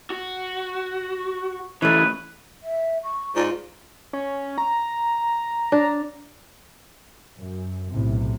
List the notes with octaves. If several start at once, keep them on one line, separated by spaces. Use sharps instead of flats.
F#4
A2 C#3 E3 A3 B4
E5
C#6
G#2 F4 D5
C#4
A#5
D4
F#2
B1 A2 C3